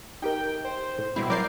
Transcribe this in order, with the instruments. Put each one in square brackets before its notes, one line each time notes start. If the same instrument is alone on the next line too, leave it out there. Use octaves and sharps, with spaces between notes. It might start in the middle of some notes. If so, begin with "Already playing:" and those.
[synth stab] D#4 G4 A#4 [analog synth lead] G5
[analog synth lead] C5
[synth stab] A2
[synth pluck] B2 G3 C4 [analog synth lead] E4 [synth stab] B5
[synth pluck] F#3 D5 [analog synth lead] A#4 [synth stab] D6 G6 C7